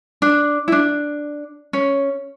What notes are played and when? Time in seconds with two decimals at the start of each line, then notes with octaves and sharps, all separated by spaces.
0.22 D4
0.68 E4
0.72 D4
1.73 C#4